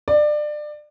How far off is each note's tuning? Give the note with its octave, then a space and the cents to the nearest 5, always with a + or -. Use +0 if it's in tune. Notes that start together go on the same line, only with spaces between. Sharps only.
D5 +25